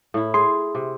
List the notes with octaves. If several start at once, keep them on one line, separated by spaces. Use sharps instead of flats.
A2 E4
G#4 C6
C3